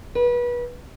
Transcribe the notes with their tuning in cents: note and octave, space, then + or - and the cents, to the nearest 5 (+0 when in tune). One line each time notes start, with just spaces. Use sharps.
B4 -30